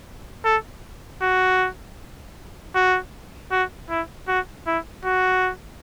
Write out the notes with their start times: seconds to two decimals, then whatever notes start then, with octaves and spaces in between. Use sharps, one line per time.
0.45 A4
1.22 F#4
2.75 F#4
3.52 F#4
3.90 E4
4.28 F#4
4.67 E4
5.05 F#4